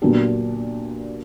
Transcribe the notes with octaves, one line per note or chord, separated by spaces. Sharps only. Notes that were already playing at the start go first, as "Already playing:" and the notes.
A#2 F#3 B3 D4 G4